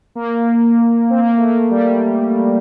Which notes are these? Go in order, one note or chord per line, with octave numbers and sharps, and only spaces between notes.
A#3
C4
A#3
A3
A#3
G3